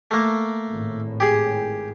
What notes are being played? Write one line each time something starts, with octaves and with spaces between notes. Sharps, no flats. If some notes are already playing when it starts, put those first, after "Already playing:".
A3 A#3
G#1 A2
G4 G#4